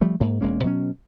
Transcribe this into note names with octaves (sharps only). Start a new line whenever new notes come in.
F3 G3 A3
G#2 A#3
E1 G#3 A#3 C#4
B2 F#3 C4 C#4